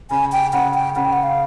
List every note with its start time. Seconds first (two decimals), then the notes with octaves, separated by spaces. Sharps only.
0.10 C#3 G#5
0.32 G5
0.53 C#3 F#5
0.74 G5
0.96 C#3 F#5
1.05 G5
1.13 F#5
1.23 F5